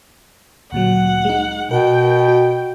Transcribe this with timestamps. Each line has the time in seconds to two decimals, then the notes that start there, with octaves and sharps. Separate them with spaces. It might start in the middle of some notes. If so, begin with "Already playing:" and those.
0.72 D2 A#2 F#3 F#5
1.25 G#3 D#4
1.71 B2 A#4 F#5 G5
2.28 F#4